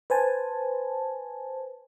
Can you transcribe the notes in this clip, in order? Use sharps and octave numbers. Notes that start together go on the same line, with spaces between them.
B4 C5 G#5 A5